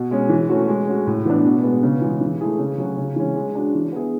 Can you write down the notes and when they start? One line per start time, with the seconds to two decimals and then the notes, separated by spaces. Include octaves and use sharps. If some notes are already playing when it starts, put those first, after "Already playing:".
Already playing: B2
0.11 G#3 C#4
0.29 E3
0.49 A3 C#4 F#4
0.68 G#3
0.87 C#4 F#4
1.07 A2
1.25 E3 B3 D4
1.44 B2
1.64 G#3 B3
1.83 C#3
2.01 E3 G#3
2.21 E3
2.41 A3 E4 G#4
2.59 C#3
2.78 F#3 C#4 F#4
2.97 C#3
3.16 E3 G#3 C#4
3.36 G#3
3.55 D4 F#4
3.75 E3
3.92 B3 E4 G#4